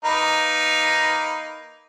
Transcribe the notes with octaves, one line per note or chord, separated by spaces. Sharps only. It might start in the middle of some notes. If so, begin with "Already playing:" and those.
A#3 D#4 B4